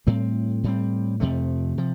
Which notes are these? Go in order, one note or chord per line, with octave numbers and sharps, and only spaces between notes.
A2 G3 C4
A2 G3 C4
F2 C3 F3 A3
C3 F3